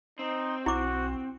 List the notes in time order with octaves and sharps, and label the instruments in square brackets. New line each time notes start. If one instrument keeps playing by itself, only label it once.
[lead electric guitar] C4 [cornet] D#4
[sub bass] B1 [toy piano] E4 D6 [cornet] F#4